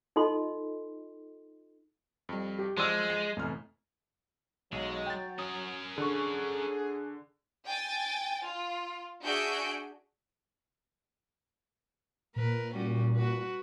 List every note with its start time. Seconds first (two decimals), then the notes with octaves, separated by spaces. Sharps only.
0.16 D#4 F4 A4 D#5 C6
2.29 F2 G3
2.59 G4
2.77 F3 G#3 D5 C6 E6 F6
3.09 C7
3.37 F1 E2 A2 F6
4.72 B1 F#3 G#3
5.06 G5 A6
5.39 C#4 A#4 D#6
5.98 D3 G#4 C#6
7.66 G5 G#5 A6
8.44 F4
9.22 D4 F#4 G#4 E5 G6 D7
12.36 A#2 A#4 B4
12.73 G3 C#4 F#4
13.15 F#4 B4